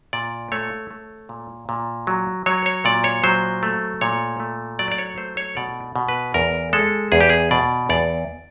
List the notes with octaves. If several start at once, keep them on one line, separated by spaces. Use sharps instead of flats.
A#2 D5
A3 C#5
A3
A#2
A#2
F#3
F#3 C#5
C#5
A#2 D5
C#5
F#3 C5
A3
A#2 C#5
A3
F#3 D5
D5
C#5
A3 C5
C#5
B2 D5
B2
B4
E2 A#4
G#3 A4
E2 G#4
G4
G#4
B2 D5
E2 D5